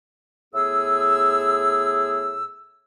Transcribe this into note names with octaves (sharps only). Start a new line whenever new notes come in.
A2 B3 G#4 E6